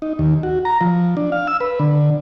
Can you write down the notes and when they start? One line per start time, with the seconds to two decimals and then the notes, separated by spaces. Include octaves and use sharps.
0.02 D#4
0.19 D#2
0.43 F#4
0.65 A#5
0.81 F3
1.17 D4
1.32 F5
1.47 E6
1.60 B4
1.79 D3